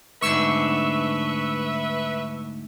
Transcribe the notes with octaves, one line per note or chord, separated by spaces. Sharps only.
D2 G#2 D4 B4 E5 C#6 E6